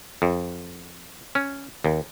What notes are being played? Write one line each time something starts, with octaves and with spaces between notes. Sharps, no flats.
F2
C#4
D#2